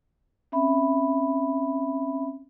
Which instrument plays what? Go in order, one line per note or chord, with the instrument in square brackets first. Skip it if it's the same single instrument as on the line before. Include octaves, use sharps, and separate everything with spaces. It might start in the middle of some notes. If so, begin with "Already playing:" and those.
[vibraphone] C4 C#4 E5 B5